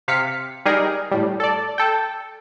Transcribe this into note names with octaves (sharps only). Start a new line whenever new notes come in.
C3 F5 B6 C#7
G3 D#4 G#4 A#4
A2 G3
A4 D5
A4 G5